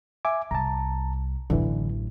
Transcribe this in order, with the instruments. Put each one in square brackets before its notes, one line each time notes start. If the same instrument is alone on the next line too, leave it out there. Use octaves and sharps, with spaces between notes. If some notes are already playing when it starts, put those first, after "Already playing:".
[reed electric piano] E5 G#5 D6
[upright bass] C2 [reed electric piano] A5 A#5
[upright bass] A1 F#2 [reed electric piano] D3 E3